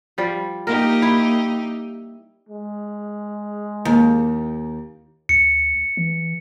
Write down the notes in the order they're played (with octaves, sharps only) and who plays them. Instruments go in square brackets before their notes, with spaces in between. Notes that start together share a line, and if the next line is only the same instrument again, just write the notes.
[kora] F3 G3
[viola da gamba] A#3 D#4 G4 [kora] A#4
[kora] E4
[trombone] G#3
[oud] D#2
[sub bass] D2 [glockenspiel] C#7
[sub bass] E3